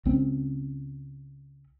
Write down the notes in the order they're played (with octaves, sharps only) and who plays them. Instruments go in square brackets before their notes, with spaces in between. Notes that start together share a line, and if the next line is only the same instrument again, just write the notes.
[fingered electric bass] C#2 C4 C#4